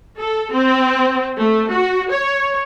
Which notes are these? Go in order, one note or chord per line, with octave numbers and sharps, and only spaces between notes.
A4
C4
A3
F#4
C#5